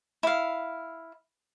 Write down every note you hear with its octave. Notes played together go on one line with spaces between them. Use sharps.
E4 F5